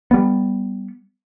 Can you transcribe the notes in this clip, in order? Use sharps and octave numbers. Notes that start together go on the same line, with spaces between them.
G3 B3